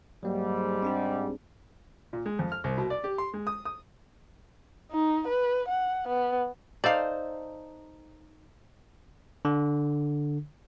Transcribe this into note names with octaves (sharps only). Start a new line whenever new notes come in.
G#2 F#3 G3 A#3
C4 D4 G#4
A#2
G#3
F2
F6
C2
B2
D5
G4
C6
G#3
D#6
D#6
D#4
B4
F#5
B3
D#4 A4 C5 D5 F5
D3